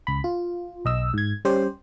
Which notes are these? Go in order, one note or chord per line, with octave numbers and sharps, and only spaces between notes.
C#2 B5
F4
B1 D#5 E6
G#2 G#6
G3 C#4 G4 C5